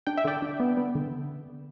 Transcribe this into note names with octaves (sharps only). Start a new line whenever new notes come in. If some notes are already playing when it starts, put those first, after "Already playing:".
D4 G5
E5
D3 D5 G5
D4
B3
B3
D3